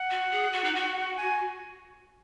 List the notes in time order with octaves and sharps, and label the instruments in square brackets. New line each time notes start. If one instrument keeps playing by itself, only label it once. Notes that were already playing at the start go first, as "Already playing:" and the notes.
Already playing: [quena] F#5
[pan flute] F#4
G#4
F#4
D#4
F#4
[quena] G#5